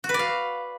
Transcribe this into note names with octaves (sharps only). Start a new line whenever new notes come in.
F#4
B4
D5
F5